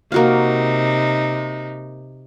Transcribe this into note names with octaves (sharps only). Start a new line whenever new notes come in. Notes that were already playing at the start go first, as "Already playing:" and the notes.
C3 A#3 D#4 F#4 F5